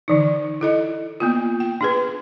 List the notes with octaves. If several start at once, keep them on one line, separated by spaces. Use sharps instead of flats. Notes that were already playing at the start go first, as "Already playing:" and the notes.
D3 E3 D#4
E4 A4 D#5
A#3 B3 F4
G5
D4 G#4 B4